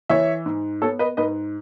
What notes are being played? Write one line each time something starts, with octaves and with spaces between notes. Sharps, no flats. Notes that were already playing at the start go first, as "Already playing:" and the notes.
E3 C#5 E5
G#2
B3 A4 C#5
B4 D#5
G#2 B4 D#5